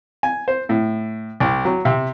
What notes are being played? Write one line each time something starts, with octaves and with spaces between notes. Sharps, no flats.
G#5
C5
A2
C2
F#3
C3